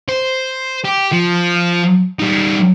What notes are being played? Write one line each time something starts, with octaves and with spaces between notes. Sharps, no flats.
C5
G4
F3
G3 D#4